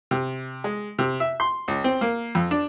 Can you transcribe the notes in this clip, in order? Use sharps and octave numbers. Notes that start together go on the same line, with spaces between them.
C3
G#3
C3
E5
C6
C#2
C4
A#3
F2
D4